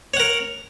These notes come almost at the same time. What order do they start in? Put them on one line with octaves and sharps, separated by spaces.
C#5 F#5 A#4